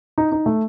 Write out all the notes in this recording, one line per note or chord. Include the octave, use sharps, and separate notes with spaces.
D#4
D#4
A3